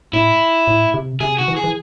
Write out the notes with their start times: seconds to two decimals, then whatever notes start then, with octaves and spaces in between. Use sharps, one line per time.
0.13 A2 E4
0.67 A2
0.94 C3
1.20 C3 G#4
1.39 F#4
1.48 E3
1.56 G#4
1.64 E3